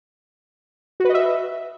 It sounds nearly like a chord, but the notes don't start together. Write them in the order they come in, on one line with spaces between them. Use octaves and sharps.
F#4 B4 D#5 E5